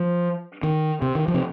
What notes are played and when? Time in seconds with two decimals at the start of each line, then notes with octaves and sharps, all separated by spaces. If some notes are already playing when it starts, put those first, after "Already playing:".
Already playing: F3
0.63 D#3
1.02 C3
1.15 D#3
1.28 F3
1.34 C3